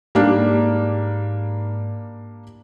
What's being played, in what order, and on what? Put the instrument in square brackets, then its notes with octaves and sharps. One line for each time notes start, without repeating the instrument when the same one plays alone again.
[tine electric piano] G#2 [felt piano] G3 A#3 D4